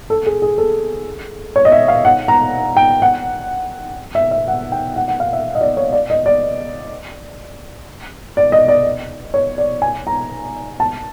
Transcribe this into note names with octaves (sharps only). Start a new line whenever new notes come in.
A4
G#4
G#4
A4
C#5
D#5
E5
F5
F#5
A#5
G5
F#5
E5
E5
F#5
G5
F#5
F#5
F5
E5
D#5
D5
C#5
D5
D#5
D5
D5
D#5
D5
C#5
D5
G#5
A#5
A5